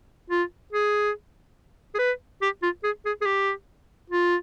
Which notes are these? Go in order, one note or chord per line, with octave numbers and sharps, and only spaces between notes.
F4
G#4
G#4
B4
G4
F4
G#4
G#4
G#4
G4
F4